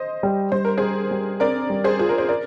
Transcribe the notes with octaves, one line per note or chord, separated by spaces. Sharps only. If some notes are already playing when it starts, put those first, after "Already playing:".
Already playing: C5 D#5
G3
G3 C5
A#4
G3 G#4 C5
G3
C4 A#4 D5
G3
G#4 C5
F4 G#4
A#4
C5
A#4 D5